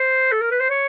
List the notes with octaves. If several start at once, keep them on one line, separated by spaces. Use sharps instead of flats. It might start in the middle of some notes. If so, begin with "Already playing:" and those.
Already playing: C5
A4
A#4
B4
C5
C#5